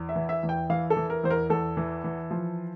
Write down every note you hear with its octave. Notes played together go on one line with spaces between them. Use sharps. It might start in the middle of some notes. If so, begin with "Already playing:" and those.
Already playing: E2
E5
E3
E5
E2
G5
E3 F5
A4
E3
A#4
E2 C5
A#4
E2 A4
E3
E3
F3